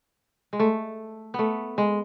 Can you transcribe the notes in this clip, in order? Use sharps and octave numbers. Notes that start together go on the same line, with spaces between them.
G#3
A3
A3 B3
G#3